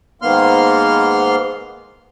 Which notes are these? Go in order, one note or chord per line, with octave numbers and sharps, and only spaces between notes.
G#2 D#3 A#3 B3 C6 F6